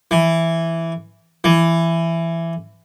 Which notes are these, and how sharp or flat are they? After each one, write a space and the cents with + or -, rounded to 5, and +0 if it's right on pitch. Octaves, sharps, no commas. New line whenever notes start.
E3 +5
E3 +15